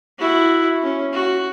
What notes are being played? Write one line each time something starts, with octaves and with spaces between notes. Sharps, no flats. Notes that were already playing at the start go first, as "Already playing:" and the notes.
E4 F#4
C#4
F#4